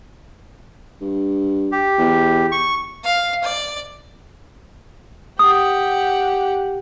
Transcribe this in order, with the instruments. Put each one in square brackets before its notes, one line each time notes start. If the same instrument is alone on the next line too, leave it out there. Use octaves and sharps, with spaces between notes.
[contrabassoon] G2
[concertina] G4
[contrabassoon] E2
[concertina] C#6
[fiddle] F5
D5
[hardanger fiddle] G4 F#5 [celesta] D#6